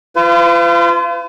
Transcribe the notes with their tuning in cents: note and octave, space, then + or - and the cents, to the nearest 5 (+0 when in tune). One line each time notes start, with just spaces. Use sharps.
F4 -30 B4 +45